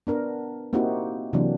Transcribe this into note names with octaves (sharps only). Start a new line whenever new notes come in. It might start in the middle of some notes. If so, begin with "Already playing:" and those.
B3 D4 A#4
A#3 C4 D#4 E4 F#4 G4
C3 E3 F#3 A#3 D4